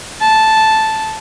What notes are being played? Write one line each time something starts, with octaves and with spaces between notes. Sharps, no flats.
A5